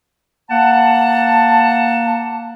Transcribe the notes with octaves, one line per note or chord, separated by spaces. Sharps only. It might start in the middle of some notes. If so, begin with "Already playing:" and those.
A#3 F#5 A5